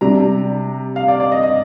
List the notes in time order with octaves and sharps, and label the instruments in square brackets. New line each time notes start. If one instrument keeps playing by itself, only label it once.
[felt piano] C3 G3 D4 [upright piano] A#5
[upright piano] F5
D5
D5
D#5
D#5